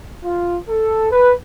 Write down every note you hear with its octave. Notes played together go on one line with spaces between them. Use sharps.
F4
A4
B4